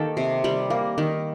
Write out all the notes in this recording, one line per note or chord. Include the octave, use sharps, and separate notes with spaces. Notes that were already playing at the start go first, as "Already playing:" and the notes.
Already playing: D#3 A#3 G4 A4
C3
G3
A#3
D#3